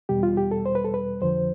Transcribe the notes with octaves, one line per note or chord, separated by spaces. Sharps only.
E2 B2 G3 G4
F4
G4
A4
C5
B4
A4
B4
F2 D3 F3 C5